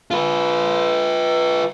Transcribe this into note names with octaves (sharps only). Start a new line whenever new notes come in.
F4 B4